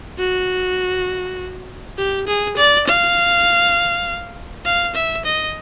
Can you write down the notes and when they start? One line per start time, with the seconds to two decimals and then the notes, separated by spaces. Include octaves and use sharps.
0.19 F#4
1.98 G4
2.27 G#4
2.57 D5
2.87 F5
4.65 F5
4.95 E5
5.25 D#5